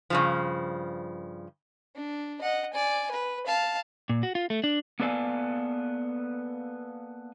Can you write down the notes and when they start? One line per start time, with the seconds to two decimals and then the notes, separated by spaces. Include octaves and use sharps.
0.10 G2 C#3 F3
1.95 D4
2.41 D#5 F#5
2.74 D5 G#5
3.11 B4
3.46 F5 A5
4.09 A#2
4.23 F#4
4.35 F4
4.50 A3
4.64 D4
5.00 A#3 B3 A4 D5 F5 G#5